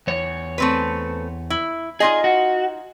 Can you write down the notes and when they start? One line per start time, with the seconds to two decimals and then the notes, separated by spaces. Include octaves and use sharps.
0.07 E2 C#5
0.58 A3 C4 B4
1.50 E4
2.00 D#4 F4 G#4 D#5
2.24 F#4